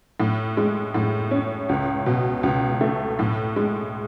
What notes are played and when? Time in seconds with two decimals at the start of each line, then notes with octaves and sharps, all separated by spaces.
0.20 A2
0.57 G#3
0.94 A2
1.31 C#4
1.69 C#2
2.06 B2
2.43 C#2
2.81 A3
3.19 A2
3.56 G#3